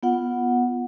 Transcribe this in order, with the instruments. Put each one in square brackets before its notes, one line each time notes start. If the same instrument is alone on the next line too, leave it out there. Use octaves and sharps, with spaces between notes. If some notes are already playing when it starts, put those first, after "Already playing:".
[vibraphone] B3 F4 F#5